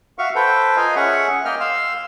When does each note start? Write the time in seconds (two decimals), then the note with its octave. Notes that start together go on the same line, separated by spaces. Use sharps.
0.18 F#4 E5 F5 C#6
0.35 A4 B4 C5 G5
0.76 F4 A#4 D#5 F5 G#5
0.96 C#4 G#4 E5 F#5 C#6
1.45 A#3 D#5 G5 F6
1.60 F5 C6 E6